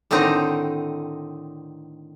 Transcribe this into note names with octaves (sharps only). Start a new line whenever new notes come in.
A2 D3 D#3 C4 D#4 A#5